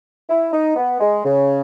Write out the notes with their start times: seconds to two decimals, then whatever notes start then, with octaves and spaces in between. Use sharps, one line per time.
0.29 E4
0.53 D#4
0.76 B3
1.00 G#3
1.25 C#3